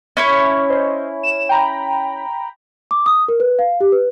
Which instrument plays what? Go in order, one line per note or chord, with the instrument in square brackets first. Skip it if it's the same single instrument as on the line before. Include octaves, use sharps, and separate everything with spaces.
[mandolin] C#4 E4 C#5
[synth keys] C5 D#5
E7
G5 A#5 B5
[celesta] D6
D#6
A#4
B4
F5
G4
B4